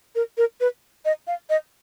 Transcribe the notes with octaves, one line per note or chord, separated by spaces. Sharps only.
A#4
A#4
B4
D#5
F5
D#5